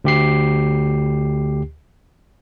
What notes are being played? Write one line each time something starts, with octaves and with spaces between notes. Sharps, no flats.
D2 G4 C7